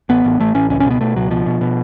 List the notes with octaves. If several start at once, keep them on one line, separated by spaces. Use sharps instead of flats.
A1 B3
A1
A1 A3
A1 C#4
C#2 C#4
C#4
B2 B3
B2 A3
C#2 F#3
B2 F3
B2
B2